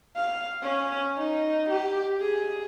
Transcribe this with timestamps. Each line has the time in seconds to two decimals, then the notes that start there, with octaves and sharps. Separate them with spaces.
0.16 F5
0.62 C#4
1.17 D#4
1.69 G4
2.20 G#4